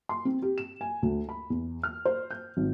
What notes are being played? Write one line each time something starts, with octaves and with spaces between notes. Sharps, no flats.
C6
C4
G4
E7
G#5
D2
B5
E2
F6
C5
G6
G#1